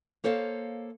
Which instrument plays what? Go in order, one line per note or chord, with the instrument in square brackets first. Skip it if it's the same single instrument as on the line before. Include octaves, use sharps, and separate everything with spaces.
[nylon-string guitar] A#3 A4 C5 C#5 F5